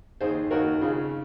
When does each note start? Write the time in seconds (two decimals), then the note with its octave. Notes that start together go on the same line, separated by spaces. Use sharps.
0.21 D#2 G#4 C5
0.51 D#2 F#4 A#4
0.81 C#3 F4 G#4